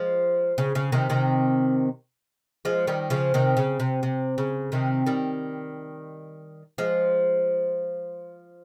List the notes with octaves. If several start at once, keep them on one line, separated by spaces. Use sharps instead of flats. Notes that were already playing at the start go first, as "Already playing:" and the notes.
Already playing: F3 G#3
C#3
C#3
C3 D#3
C3 D#3
F3 G#3
D#3 G3
C#3 F3
C3 D#3
C#3
C3
C3
C#3
C3 D#3
D#3 G3
F3 G#3